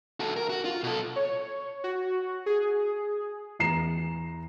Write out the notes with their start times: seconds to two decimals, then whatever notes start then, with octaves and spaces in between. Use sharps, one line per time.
0.20 F#4 A4
0.36 A#4
0.49 F#4
0.65 F4
0.84 B2 A4
1.16 C#5
1.84 F#4
2.46 G#4
3.59 E2 A#5 C7 E7